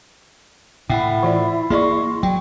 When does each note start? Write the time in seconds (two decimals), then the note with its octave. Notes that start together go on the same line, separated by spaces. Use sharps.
0.90 A2 E4 E5 F#5 G5 B5
1.23 E3 F4 D5
1.70 A#3 G#4 D5 D#5 C6 C#6
2.23 F#3 G5